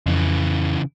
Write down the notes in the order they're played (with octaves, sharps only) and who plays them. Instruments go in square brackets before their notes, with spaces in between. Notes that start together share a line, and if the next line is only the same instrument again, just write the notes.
[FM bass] F2 [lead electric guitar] C#3 E3